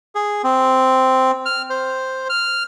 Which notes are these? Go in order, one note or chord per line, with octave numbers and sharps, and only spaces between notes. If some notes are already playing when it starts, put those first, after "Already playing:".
G#4
C4
F6
C5
F6